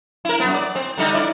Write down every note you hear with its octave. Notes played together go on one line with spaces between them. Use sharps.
E4 A#4
F#2 B3
D5
C4
D3 G3 D#4
E4 D5